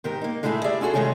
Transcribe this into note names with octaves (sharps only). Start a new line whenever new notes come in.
G#2 D#3 G4 A#4
A#3 D#4
A2 G#3 A3 E4 F#4 G#4
G4 G#4 D5 E5
C#4 F4 F#4 G#4 A4
C3 D#3 G#3 A3 C#4 G#4